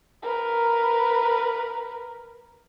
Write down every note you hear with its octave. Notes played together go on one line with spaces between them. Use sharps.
A#4 B4